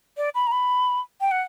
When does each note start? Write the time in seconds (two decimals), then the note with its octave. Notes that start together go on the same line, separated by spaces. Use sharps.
0.17 D5
0.35 B5
0.47 A#5
0.52 B5
1.21 G5
1.31 F#5